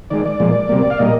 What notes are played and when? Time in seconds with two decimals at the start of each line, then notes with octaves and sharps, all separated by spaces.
0.10 D#3 G#3 D5
0.26 D5
0.40 A#2 F3 G#3
0.69 C3 G3 A#3
0.90 F5
0.99 A#2 G3 A#3 D#5